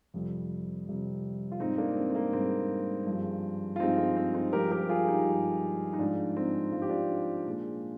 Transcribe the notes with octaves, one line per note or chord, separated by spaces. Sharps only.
F2 C3 G3
F2 C3 G3
F4
G#2 G3 C4 D#4
A#3 D4
C4
C4
A#3
G#2 G3 C4
G2 F3 G#3
F4
G2 F3 G#3 C4 D#4
C4
C4
C4 D#4
G2 F3 G#3 G4 A#4
G4 A#4
F4 G#4
D#4 G4
G2 F3 G#3
D#4
G#2 F3 G#3 D4 F4
C4 D#4
G#2 F3 G#3 F4
G4
D4 F4
A#2 G#3